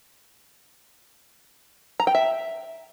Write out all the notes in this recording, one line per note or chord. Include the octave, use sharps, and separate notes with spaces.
A#5
G5
E5